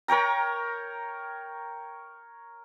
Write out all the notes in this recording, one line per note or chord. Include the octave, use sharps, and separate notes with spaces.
A#4 C#5 G5 A#5